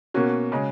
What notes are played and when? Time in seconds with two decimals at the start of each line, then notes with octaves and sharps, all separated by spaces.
0.14 B2 A#3 C#4 F#4
0.52 C#3 G#3